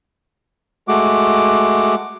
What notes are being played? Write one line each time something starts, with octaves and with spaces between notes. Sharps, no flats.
G#3 A3 F#4 D6